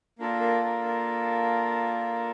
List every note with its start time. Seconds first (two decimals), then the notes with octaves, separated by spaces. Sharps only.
0.19 A#3 D4 F4 A4 A#4
0.41 A#4
0.63 A#4
0.85 A#4